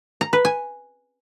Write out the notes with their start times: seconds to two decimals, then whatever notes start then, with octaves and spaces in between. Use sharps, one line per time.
0.21 A#5
0.33 B4
0.45 G#5